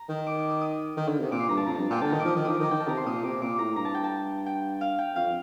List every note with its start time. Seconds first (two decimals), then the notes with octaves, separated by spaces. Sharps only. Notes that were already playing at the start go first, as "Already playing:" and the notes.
Already playing: A#5
0.09 D#3
0.27 D6
0.39 D6
0.50 D#6
0.61 D#6
0.97 D#3
1.08 D3
1.20 C3
1.31 A#2 D6
1.40 C6
1.49 G2 A#5
1.57 A5
1.67 F2 A#5
1.75 G2 A5
1.90 A#2 G5
2.01 D3 A5
2.10 D#3 A#5
2.20 D6
2.25 F3 D#6
2.36 D#3 D6
2.45 F3 D#6
2.55 D6
2.60 D#3
2.63 A#5
2.71 D#3 G5
2.80 A5
2.89 C3 A#5
2.97 C6
3.06 A#2 D#6
3.24 C3 D6
3.42 A#2 D6
3.59 A2 A#5
3.76 G2 A#5
3.85 A5
3.95 G5
4.04 A5
4.46 G5
4.81 F5
4.99 G5
5.16 F2 F5